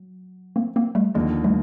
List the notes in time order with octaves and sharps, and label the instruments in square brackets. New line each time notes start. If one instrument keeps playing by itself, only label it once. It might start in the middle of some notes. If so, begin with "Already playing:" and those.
Already playing: [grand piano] F#3
[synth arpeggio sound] A#3 C4
A#3 C4
G3 A3
[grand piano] D#2 D3 F3 A#3 [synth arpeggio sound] G#3
[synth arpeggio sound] G3 A3